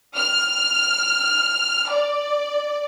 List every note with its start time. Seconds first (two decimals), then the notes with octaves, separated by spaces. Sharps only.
0.16 F6
1.90 D5